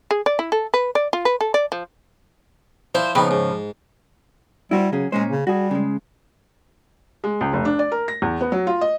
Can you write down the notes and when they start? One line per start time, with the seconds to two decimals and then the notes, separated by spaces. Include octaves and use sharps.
0.11 G#4
0.26 D5
0.39 E4
0.52 A4
0.74 B4
0.95 D5
1.13 F4
1.25 B4
1.41 A4
1.54 D5
1.72 F3
2.95 F3 E4 C5
3.15 C#3 F3 B3 D#4 G5 B5
3.31 G#2
4.71 G3 E4 F#4 C5
4.92 C#3 F#3 C#4 G#4
5.12 A#2 G#3 C#4 C5
5.31 C#3
5.47 G3 F#4 G#4
5.71 C#3 G#3
7.24 G#3
7.41 C#2
7.53 F1
7.65 D4
7.79 D5
7.92 A#4
8.08 A#6
8.22 E2
8.41 B3
8.52 F#3
8.67 F4
8.81 D#5